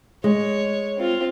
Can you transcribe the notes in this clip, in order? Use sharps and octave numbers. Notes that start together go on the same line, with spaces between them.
G#3 C#5
C4 F4